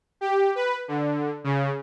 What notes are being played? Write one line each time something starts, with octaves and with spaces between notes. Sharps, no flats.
G4
B4
D3
C#3